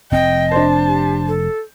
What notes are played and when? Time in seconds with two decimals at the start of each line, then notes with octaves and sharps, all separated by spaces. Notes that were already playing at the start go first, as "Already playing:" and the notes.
0.12 F1 C4 D#5 G5
0.51 D4 C5 A5
0.87 G4
1.28 A4